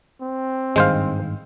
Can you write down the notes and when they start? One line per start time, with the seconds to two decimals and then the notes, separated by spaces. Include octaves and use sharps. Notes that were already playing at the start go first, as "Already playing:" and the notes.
0.22 C4
0.76 G#1 G2 D#3 G#3 C5 F5